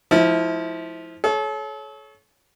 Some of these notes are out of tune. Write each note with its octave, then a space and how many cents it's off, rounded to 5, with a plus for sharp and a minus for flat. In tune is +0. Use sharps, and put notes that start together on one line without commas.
F3 +0 A3 -45 E4 -25
A4 -40 C#5 +0